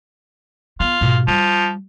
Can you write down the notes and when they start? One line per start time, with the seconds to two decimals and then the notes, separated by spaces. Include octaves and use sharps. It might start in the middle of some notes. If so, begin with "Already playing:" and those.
0.80 B3 F4
1.01 G#2 B2
1.27 F3 G3